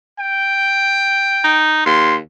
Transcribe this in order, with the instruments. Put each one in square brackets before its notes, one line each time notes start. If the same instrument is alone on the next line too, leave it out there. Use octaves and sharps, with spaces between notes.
[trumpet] G5
[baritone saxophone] D#4
[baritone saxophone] D#2 [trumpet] C6